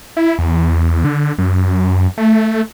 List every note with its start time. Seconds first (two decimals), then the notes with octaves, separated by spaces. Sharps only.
0.17 E4
0.38 E2
1.05 D3
1.38 F#2
2.18 A3